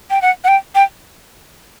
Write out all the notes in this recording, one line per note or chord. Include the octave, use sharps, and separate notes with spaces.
G5
F#5
F#5
G5
G5